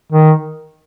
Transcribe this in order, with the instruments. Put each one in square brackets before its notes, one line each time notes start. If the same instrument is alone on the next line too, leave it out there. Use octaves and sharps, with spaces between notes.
[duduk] D#3